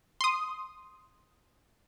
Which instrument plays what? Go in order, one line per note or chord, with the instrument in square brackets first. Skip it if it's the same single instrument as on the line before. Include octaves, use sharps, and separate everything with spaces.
[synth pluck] C6 D#6